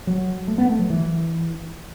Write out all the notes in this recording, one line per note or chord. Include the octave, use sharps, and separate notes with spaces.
F#3
A3
B3
A3
F#3
E3